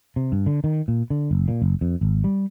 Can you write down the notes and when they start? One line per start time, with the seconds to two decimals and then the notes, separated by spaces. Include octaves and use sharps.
0.16 C3
0.32 G2
0.46 D3
0.64 D#3
0.88 A#2
1.10 D3
1.31 F#1
1.48 A#2
1.62 F#1
1.81 F2
2.01 G#1
2.24 G3